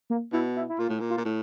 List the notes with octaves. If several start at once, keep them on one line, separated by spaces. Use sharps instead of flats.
A#3
B2 E4
E4
E4
A#2 F4
A2
A#2
F4
A#2
A2